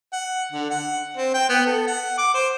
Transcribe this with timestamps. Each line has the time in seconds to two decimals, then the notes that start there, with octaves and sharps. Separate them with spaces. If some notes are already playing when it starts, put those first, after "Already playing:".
0.13 F#5
0.52 D3
0.70 F#5
1.17 C4
1.34 G5
1.49 B3
1.66 A4
1.87 F#5
2.18 D6
2.34 C5